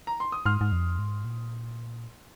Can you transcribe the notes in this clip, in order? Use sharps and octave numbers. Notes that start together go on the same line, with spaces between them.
A#5
C6
D#6
G#2 C6 F6
G#2
F2
G#2
A#2